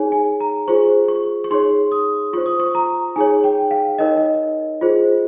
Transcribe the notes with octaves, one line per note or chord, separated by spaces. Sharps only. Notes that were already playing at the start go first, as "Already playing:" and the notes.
Already playing: D#4 G#4 C#5 G#5
G#5
A#5
F4 G#4 C5 C#6
C#6
C#6
D#4 G#4 C#5 C6
D#6
F4 C5 C#6
D#6
C#6
A#5
D#4 G#4 C#5 G#5
G5
F5
D#4 A#4 C#5 D#5
D#5
F4 G#4 C5